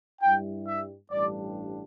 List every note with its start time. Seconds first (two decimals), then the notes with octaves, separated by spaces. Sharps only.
0.22 G2 G3 E4 G5
0.68 E5
1.12 A1 G2 G3 D4 D5